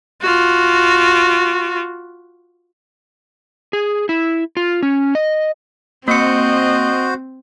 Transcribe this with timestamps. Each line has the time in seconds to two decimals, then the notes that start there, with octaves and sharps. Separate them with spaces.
0.22 F4 F#4
3.73 G#4
4.09 E4
4.57 F4
4.83 C#4
5.15 D#5
6.08 A#3 C4 F#4 C5 D#5 C#7